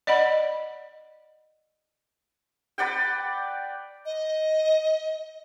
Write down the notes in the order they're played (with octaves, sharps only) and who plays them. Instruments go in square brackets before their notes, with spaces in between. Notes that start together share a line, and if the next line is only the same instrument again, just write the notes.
[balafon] D5 D#5 F#5 B5
[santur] B4 D5 F#5 G5
[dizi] D#5